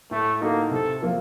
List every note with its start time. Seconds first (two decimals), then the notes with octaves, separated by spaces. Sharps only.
0.11 A2 A3
0.41 A3 A#3 D#4 F#4 A4
0.71 C3 A4
1.02 F3 A#3 F4